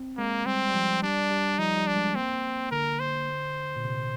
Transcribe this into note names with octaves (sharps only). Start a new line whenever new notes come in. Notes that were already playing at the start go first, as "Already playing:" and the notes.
Already playing: C4
G#3 A#3
G3 C4
G3
F3
G3 D4
G3
F3 D#4
G3
D4
G#3
A#3 C4
D3 A#4
C5
A#2
C3